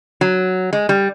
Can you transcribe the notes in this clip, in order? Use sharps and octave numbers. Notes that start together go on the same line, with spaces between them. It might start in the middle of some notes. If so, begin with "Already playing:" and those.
F#3
G#3
G3